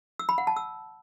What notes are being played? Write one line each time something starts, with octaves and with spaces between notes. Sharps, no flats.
E6
B5
F#5
A5
E6